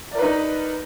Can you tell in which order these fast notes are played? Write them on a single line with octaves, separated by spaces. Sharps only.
D5 A#4 B4 D#4